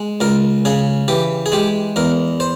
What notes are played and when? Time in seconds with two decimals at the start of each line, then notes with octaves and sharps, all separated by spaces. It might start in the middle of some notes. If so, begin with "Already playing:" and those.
Already playing: G#3
0.21 C#2 A#4
0.65 C#3 G#4
1.08 E3 G4
1.46 G#4
1.52 G#3 G4
1.96 E2 A#4
2.40 C5